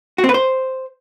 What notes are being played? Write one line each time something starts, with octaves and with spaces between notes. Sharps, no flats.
F#4
C4
B4
C5